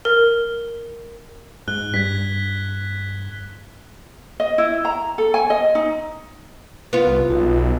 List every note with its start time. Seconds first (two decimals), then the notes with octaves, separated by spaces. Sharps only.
0.05 A#4
1.68 G#2 F#6 G7
1.94 G2 G#6 B6
4.40 D#5
4.58 E4
4.85 A#5
5.18 A4
5.34 G#5
5.50 D#5
5.75 D#4
6.93 B3 F4
7.07 C2
7.30 B1